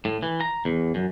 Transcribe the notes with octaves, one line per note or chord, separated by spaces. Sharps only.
A2
E3
A#5
E2
F#2